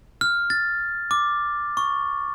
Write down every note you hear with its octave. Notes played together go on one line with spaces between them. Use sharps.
F6
A6
D6
C#6